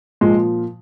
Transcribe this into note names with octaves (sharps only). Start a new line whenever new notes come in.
A#2 F3 G#3